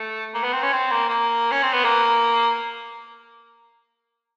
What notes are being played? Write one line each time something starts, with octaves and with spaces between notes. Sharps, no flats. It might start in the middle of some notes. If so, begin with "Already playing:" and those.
Already playing: A3
A#3
B3
C4
C#4
C4
A#3
A#3
C#4
C4
B3
A#3